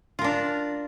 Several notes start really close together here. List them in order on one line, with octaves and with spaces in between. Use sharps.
F4 A#4 D4